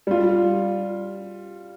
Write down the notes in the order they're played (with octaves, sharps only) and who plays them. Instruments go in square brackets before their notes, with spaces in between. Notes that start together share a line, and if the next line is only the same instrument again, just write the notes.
[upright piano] G3 F4